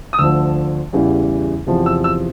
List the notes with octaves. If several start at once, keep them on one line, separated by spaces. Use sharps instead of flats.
D#6
D2 D3 F3 E6
E2 C#3 E3 G3
E2 C3 F3
E6
E6